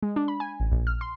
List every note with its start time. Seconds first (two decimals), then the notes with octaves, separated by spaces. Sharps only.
0.03 G#3
0.16 D4
0.28 B5
0.40 G#5
0.60 A1
0.72 A#1
0.87 F6
1.01 C6